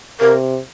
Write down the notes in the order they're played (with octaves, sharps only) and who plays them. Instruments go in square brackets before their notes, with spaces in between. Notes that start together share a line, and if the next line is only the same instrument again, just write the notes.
[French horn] C3 [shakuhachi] A#4